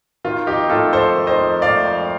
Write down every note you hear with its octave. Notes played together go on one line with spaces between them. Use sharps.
D#3 F4
F2 D#4 G4
A3 F4 A4
F2 A4 C5
D#3
C5 D#5
F2
A3 D5 F5
F2